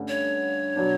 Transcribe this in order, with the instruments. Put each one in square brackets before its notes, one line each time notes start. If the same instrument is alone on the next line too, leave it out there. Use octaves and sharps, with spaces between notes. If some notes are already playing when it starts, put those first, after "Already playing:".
Already playing: [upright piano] G2 D3 A3 C#4
[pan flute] C#5
[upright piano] B2 F#3 B3 D4